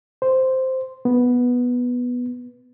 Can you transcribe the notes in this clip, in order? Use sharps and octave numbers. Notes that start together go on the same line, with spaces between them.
C5
B3